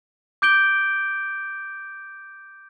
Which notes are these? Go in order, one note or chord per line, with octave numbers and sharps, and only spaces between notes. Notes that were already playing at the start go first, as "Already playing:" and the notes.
D6 G6 D7 G7